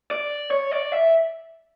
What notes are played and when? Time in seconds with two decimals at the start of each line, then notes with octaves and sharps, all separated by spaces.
0.11 D5
0.51 C#5
0.72 D5
0.92 E5